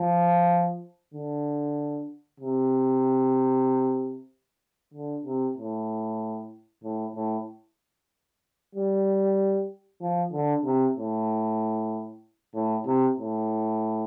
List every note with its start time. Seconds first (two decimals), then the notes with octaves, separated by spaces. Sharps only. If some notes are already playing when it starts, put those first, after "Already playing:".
Already playing: F3
1.14 D3
2.40 C3
4.94 D3
5.26 C3
5.57 A2
6.84 A2
7.15 A2
8.75 G3
10.01 F3
10.32 D3
10.65 C3
10.96 A2
12.55 A2
12.86 C3
13.19 A2